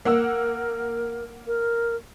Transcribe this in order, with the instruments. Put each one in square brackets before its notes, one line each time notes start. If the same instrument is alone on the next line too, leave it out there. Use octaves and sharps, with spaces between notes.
[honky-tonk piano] A#3 F#5 E6 [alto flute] A#4
[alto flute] A#4